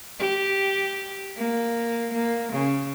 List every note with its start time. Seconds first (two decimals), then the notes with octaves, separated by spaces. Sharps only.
0.19 G4
1.37 A#3
2.13 A#3
2.52 C#3